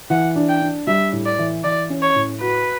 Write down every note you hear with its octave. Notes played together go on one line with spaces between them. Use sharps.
E3 F#5
D4
G5
D4
G3 E5
A2
D5
E3
E3 D5
C#4
C#5
A2
F#4 B4